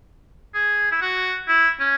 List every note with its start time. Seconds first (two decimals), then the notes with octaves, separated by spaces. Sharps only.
0.54 G#4
0.92 E4
1.02 F#4
1.48 E4
1.80 C#4